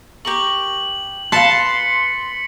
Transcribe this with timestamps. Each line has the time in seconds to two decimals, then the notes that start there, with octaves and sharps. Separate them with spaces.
0.25 G4 A#4 C#6 F#7
1.32 B4 F5 A5 C6 A6 B6 C#7